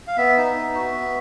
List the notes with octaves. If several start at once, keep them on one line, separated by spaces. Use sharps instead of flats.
F5
B3 E5
D#4
B3
F#4
B3